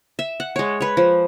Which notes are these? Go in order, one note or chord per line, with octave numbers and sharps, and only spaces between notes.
E5
F#5
G#3 C#5
B4 C#5
F3